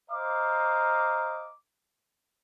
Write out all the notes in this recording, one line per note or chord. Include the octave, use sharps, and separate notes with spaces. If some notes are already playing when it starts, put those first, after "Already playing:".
C5 D#5 F5 A#5 D6